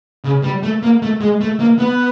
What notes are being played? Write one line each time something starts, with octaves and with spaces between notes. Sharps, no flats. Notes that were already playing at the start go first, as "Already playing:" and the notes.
C#3
G3
A3
A#3
A3
G#3
A3
A#3
B3